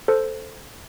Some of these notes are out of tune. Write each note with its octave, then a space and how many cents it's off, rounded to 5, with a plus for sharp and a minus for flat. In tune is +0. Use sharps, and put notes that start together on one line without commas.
A4 +0 C5 +0